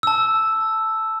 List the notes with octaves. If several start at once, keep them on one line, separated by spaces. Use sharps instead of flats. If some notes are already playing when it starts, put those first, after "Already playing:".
A5 E6